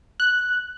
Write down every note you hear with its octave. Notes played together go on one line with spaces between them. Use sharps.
F#6